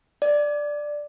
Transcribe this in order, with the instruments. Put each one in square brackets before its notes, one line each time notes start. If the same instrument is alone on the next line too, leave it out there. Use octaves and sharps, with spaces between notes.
[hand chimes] D5